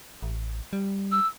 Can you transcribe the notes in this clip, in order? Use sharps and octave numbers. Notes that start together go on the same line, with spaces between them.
A1
G3
E6